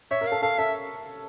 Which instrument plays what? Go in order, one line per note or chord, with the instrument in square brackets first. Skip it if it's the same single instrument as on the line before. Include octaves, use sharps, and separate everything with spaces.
[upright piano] C#5 [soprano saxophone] E5
[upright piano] A#4
[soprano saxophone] F5
[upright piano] A4
[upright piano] A4 [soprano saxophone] F5
[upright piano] A4 [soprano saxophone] E5